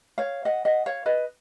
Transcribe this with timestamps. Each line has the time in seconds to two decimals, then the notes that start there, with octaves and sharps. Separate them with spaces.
0.18 C#5 F5
0.45 D#5 F#5
0.65 D#5 F#5
0.86 C#5 F5
1.06 B4 D#5